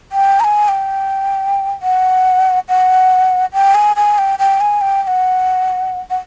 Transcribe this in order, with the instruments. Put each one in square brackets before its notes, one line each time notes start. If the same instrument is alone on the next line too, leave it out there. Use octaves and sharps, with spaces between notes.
[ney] G5
A#5
G#5
G5
F#5
F#5
G5
G#5
G#5
G5
G5
G#5
G5
G5
F#5
F#5